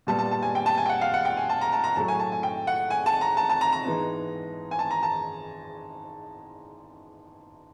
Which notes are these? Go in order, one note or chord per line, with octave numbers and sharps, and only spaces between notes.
A#2 G3 B3 A5
A5
A5
G#5
G5
A5
G#5
G5
F#5
F5
F#5
G5
G#5
A5
A#5
A5
A#5
A2 F#3 A3 A5
G#5
A5
G#5
G5
F#5
G#5
A5
A#5
A5
A5
A#5
A#5
G#2 E3 G#3 B3
G#5
A5
A#5
A5